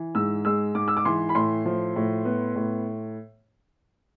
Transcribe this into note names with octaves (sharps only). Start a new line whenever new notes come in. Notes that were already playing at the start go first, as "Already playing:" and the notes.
Already playing: E3
G#2 E6
G#3 E6
G#2 D6
E6
D6
E3 C6
B5
A2 C6
F3
A2
B3
A2